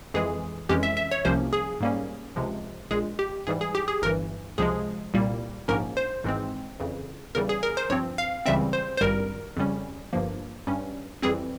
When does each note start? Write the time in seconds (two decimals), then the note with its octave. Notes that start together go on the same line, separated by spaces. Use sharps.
0.14 F2 E3 G#3 G#4
0.69 F2 E3 G#3 C#4 G4
0.83 E5
0.97 E5
1.11 C#5
1.25 C2 C3 F3 A#3 C#4 C5
1.53 G#4
1.81 G#2 G3 A#3 C#4
2.36 C#2 C3 F3 G#3
2.91 A#1 A#2 G#3 G#4
3.19 G4
3.47 G#2 E3 G3 G#4
3.61 G#4
3.75 G4
3.88 G#4
4.02 G1 G2 E3 A#4
4.58 C#2 C3 F3 G#3 G#4
5.14 C2 A#2 G3 A#3
5.68 A#1 G#2 F3 A#3 C#4 A#4
5.97 C5
6.24 G#1 G#2 E3 G#3 C4
6.80 F2 C#3 E3
7.35 E2 C#3 E3 G3 A#4
7.49 G#4
7.63 A#4
7.77 C5
7.90 G2 F3 C4 C#5
8.18 F5
8.46 C#2 C#3 E3 G3 C4 E5
8.73 C5
8.97 C5
9.01 G#1 G2 G3 A#4
9.57 F2 C#3 G3 C#4
10.13 G1 G2 F3 A#3
10.67 G2 G3 C#4
11.22 F2 E3 G3 C4 G#4